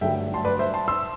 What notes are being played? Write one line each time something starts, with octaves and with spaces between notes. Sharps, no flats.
G2 D3 F#3 A3 E5 G5
A5 C6
B4 D5
C5 E5
A5 C6
C6 E6